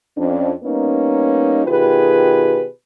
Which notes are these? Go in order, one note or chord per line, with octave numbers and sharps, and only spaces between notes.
F2 C#4 D4
G3 A#3 B3 C#4 D#4
B2 D#3 F4 G4 G#4 B4